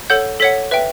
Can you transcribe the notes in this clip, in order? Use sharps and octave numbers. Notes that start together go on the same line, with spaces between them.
A4 C#5 F#5 G6
A4 C#5 F#5 B6
B4 E5 G5